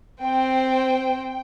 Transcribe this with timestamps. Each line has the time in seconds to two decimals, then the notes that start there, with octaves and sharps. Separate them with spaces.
0.23 C4 C5 G5